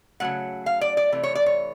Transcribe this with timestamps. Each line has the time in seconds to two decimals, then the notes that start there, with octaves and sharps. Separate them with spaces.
0.20 C#3 F#3 A3 F#5
0.66 F5
0.81 D5
0.97 D5
1.12 C3 E3 A3
1.23 C#5
1.35 D5
1.46 C#5